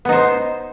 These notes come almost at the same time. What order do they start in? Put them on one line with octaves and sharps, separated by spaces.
B3 D#4 C5